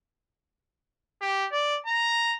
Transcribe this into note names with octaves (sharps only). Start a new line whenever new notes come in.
G4
D5
A#5